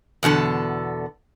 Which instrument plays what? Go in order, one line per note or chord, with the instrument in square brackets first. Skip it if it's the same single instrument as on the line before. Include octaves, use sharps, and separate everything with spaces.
[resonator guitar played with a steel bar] E2 B2 D3 A4